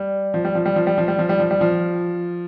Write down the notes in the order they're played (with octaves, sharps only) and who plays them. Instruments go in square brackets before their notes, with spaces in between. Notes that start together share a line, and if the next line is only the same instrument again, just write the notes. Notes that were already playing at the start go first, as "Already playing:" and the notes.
Already playing: [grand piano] G3
F3
G3
F3
G3
F3
G3
F3
G3
F3
G3
F3
G3
F3